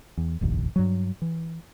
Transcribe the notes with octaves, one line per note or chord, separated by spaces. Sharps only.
E2
F1 A#1 D#2
G2 F#3
E3